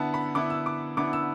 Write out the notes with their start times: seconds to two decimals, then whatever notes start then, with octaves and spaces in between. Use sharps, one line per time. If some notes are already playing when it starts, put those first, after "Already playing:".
Already playing: D3 B3 E4 F#5 A5
0.14 B5
0.35 D3 B3 E4 D6
0.50 E6
0.66 D6
0.97 D3 B3 E4 D6
1.13 E6